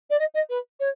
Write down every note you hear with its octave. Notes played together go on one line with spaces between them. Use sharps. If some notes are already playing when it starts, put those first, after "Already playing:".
D5
D#5
D#5
B4
C#5